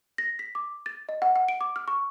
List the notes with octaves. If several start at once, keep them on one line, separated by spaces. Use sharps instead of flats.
A#6
B6
D6
A6
D#5
F#5
F#5
D7
D6
F6
C#6